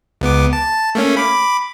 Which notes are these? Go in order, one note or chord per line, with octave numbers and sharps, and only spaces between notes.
C#2 B3 D6
A5
A3 A#3 C#4
B5 D6